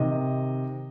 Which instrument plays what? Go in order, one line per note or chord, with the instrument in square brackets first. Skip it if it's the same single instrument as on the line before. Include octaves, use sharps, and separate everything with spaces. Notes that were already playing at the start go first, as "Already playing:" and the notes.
Already playing: [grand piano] C3 D#3 D#5